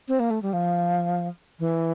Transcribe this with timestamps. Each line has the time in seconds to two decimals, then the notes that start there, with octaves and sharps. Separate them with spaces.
0.08 C4
0.20 A#3
0.30 A3
0.42 G3
0.53 F3
1.59 E3